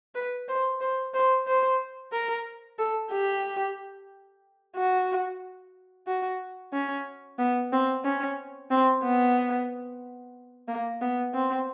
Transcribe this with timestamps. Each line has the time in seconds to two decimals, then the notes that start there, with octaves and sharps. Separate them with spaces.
0.15 B4
0.49 C5
0.81 C5
1.14 C5
1.47 C5
2.12 A#4
2.79 A4
3.12 G4
4.76 F#4
6.07 F#4
6.73 C#4
7.39 B3
7.72 C4
8.04 C#4
8.71 C4
9.03 B3
10.68 A#3
11.01 B3
11.34 C4